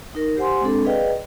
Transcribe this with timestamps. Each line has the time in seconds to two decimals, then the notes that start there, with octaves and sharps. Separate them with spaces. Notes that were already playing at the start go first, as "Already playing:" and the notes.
0.15 D#4 A#4
0.37 G4 C5 F#5 G#5 C6
0.61 G#3 C4 D4 A4
0.85 G#4 B4 D5 D#5 F5 G5